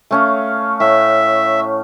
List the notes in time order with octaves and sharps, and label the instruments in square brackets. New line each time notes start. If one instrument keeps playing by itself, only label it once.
[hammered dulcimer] A3 C#4 F5
[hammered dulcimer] A2 [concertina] E5